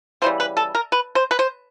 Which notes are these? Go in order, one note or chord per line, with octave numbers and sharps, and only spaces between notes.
C#3 E3 G3 C5
B4
A4
A#4
B4
C5
B4
C5